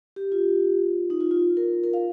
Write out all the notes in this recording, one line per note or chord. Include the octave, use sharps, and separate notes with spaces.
G4
F4
D#4
F4
F4
A#4
A#4
F5